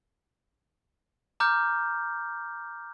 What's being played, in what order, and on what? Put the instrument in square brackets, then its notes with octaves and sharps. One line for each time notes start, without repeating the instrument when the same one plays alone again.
[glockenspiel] A#5 D6 F6 G6